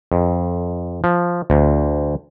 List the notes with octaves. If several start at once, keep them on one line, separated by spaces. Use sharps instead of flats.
F2
F3
D2